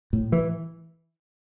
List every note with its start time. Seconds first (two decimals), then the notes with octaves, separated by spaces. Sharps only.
0.13 A2
0.32 E3